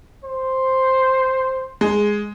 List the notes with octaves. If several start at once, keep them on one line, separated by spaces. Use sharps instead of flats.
C5
G#3